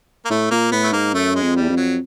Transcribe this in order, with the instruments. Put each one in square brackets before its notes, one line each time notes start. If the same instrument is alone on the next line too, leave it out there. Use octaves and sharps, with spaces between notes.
[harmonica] A#3
[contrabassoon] A2 [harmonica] A3
[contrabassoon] A#2 [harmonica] A#3
[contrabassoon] A2 [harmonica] B3
[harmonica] A3
[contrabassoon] G#2 [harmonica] A#3
[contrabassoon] F#2 [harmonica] A3
[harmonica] G#3
[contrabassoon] F2
[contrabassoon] E2 [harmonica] G3
[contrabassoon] F2
[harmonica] F#3